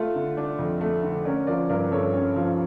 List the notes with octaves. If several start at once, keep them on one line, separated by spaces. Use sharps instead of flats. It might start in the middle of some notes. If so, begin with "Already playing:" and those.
Already playing: A3 F4
D3
D4
F2
A3
D3
C#4 A#4 D5
F3 A#4 D5
G2 A#4 D5
G2 A4 C#5
C#4
F3